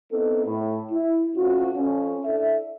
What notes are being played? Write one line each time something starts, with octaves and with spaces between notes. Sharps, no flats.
B3 C4 D#4 E4 A4
A2
E4
D2 C3 C#4 F4 F#4
F2 C#4
D4 E4 A4 E5